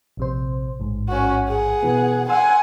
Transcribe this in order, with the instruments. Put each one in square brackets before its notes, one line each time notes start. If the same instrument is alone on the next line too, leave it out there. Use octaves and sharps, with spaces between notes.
[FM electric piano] A#1 C3 C5
A1 G#2
[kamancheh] C#4 F#4
G#4 F#5
[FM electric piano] B2 E3 B3
[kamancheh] F#5 G#5 [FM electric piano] C6 E6